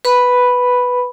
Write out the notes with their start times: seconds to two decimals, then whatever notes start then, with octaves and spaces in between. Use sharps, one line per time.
0.05 B4 B5